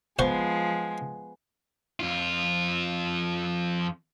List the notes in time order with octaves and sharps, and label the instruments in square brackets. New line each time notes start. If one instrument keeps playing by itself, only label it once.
[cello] F3 [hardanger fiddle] G#3 [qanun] B3 [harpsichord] C5 F#5 C#6
[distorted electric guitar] F2 F4